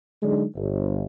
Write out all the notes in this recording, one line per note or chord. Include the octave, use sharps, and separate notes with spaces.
D3 F#3 G#3 D4 D#4 G#4
G1